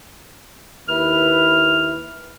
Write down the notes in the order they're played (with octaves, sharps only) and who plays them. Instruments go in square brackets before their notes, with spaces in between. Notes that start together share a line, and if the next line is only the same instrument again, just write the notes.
[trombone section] D#2 E4 B4 [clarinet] F6